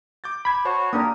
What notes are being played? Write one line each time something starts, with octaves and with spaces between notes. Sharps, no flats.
D6 G6 A6
B5 G#6
F#4 C5 C#5 A5
A#3 D4 G4 A#4 D#6